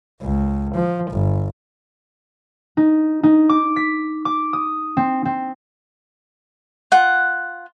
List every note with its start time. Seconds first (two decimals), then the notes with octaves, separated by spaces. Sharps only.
0.22 C#2
0.74 F3
1.11 G1
2.77 D#4
3.23 D#4
3.49 D6
3.76 B6
4.25 D6
4.53 D#6
4.97 C4
5.25 C4
6.92 F4 F#5